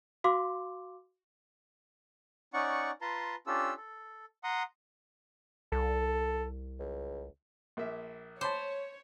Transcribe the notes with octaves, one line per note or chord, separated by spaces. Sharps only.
F#4 F5 C6 D6
C#4 D#4 D5 F#5 C#6
F4 B4 A5 A#5 C6
C#4 D4 F4 G4 A4 E6
A4
F#5 A#5 C6 D#6
C2 A4
C#2
A#1 A#3 E5
C5 C#5 A5 B5 D6